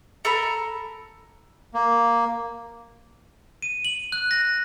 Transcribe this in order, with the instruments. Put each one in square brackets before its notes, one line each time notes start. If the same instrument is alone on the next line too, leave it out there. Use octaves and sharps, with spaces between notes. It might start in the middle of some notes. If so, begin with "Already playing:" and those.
[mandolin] A4 A#4 A#5 B5
[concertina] A#3
[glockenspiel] D#7
F#7
F#6
A#6